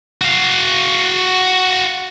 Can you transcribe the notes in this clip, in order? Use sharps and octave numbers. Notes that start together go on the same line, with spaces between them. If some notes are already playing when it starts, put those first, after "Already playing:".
F#4 F5